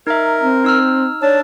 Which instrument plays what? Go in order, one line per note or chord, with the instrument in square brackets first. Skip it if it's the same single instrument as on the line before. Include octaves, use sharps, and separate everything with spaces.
[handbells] D#4 E5 [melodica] A#4
[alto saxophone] C4
[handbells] D#4 E6 F6
[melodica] D4 A5 [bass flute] C#5